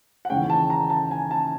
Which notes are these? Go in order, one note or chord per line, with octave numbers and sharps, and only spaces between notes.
F#5
D#2 C#3 E3 G#3 C#4 G5
A5
A#5
A5
G#5
A5